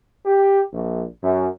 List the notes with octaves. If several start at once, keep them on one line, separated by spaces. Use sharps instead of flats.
G4
A#1
F#2